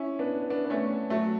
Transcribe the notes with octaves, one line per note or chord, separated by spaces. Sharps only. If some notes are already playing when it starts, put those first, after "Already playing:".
Already playing: C#4 E4
B3 D4
B3 D4
B3
A3 C#4
F#3 A3